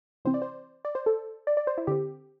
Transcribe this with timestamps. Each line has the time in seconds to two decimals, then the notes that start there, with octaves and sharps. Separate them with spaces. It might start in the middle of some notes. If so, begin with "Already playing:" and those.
0.25 C3 E3 C4 C5
0.34 D5
0.42 C5
0.85 D5
0.95 C5
1.06 A4
1.47 D5
1.57 D5
1.67 C5
1.78 E4
1.87 D3 C4 G4